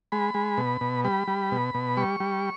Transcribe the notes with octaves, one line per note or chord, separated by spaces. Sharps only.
G#3 B5
G#3
B2
B2
G3 B5
G3
B2
B2
G3 C#6
G3